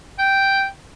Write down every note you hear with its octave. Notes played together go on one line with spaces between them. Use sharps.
G5